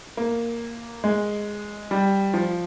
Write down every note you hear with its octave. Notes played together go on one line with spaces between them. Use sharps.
A#3
G#3
G3
F3